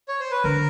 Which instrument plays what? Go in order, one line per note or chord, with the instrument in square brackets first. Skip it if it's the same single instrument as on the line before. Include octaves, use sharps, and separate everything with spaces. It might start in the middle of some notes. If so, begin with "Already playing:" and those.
[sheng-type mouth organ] C#5
C5
B4
[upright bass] D3 [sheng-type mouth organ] A#4